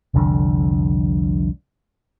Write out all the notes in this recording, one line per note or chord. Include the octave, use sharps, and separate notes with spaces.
F1 C2 F2 D3